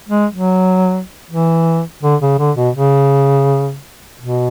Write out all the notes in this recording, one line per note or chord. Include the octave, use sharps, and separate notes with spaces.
G#3
F#3
E3
D3
C#3
D3
B2
C#3
B2